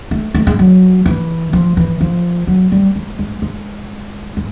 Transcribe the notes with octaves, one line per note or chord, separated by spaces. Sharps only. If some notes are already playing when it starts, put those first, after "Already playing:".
A3
A3
G#3
F#3
E3
F3
E3
F3
F#3
G3
G#3
G#3
G#3
G#3